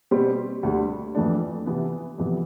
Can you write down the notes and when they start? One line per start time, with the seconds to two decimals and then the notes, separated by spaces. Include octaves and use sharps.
0.11 B2 G3 C4 G4 C5
0.63 D2 D3 G3
1.15 F2 E3 A3 D4
1.66 C3 E3 B3
2.18 F2 C3 E3 G3 B3